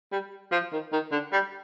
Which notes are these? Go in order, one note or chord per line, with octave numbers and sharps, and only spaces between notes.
G3
F3
D#3
D#3
D3
G3